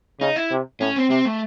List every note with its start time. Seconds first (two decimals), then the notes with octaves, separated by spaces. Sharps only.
0.20 C#3 D#4
0.36 E4
0.51 C3
0.80 A2 C#4
0.96 C4
1.10 C3 C4
1.25 A3